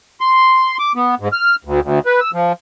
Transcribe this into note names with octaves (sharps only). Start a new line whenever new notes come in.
C6
D6
B3
G#2
F6
D2
D2
B4
E6
F3